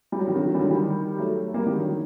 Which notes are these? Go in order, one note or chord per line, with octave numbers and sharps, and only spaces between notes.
G3
F#3
D#3
D3 F#3
D#3
G3
D3 F#3
D#3 G3
F#3 A3
G3 A#3
D#3 G3
D3 F#3
D#3